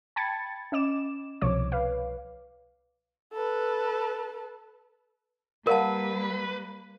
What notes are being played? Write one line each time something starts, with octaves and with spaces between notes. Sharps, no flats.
G5 A5 B5 G#6 A6 C#7
C#4 D#5 D6 E7
C2 B2 F3 C#5 D6
B4 F5
A4 B4
G3 A#3 A#4 B4 D5 F5 F#5 A5